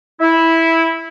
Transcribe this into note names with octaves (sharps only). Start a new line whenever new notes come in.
E4